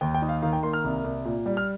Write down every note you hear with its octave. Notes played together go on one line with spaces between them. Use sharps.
D#2 G5
G5
D#4
F5
D#3 F5
G5
A#3 C6
F6
C2
C2
A#2
G3
F6